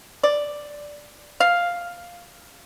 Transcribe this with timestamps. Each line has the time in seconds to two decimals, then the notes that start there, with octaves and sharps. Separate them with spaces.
0.23 D5
1.40 F5